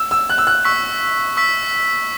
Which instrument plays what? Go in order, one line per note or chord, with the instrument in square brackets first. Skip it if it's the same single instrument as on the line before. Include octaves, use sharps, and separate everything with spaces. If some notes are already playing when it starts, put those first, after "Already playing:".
Already playing: [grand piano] E6
E6
F#6
E6
F#6
[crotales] C#6 E6 B6
C#6 E6 B6